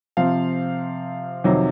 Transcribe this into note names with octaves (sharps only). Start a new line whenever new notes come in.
C3 F3 C4 F5
F2 C3 D#3 F#3